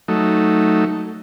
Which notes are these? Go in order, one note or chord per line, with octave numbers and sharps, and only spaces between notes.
F#3 A3 D#4